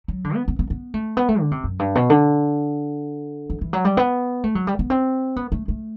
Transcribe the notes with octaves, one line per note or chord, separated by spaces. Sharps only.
F#3
D3
B3
B3
B3
B3
A3
B3
A3
D3
C3
F#2
G2
B2
D3
E3
E3
F#3
G3
B3
A3
F#3
G3
B3
C4
B3
A3
A3